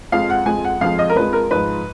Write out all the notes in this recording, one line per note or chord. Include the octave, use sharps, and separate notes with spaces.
F2 F3 G#3 F5
F#5
F2 F3 G#3 G#5
F#5
F2 F3 G#3 F5
D#5
A#4
F2 F3 G#3 B4
A#4
G#2 F3 G#3 B4